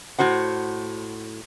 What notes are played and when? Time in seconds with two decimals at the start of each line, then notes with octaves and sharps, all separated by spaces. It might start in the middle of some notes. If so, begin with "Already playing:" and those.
0.19 A2 F#4 C5 F#5